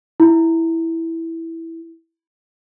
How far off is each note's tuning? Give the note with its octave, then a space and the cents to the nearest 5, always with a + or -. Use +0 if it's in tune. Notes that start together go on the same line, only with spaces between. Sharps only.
E4 -5